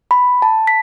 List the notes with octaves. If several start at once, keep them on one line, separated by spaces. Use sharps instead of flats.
B5
A5
B6